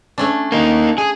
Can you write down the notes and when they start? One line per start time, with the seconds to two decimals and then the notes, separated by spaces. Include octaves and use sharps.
0.18 A3 C#4 D4
0.52 A#3 D#4
0.98 G#4